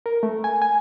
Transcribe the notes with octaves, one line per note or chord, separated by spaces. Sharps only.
A#4
A3
G#5
G#5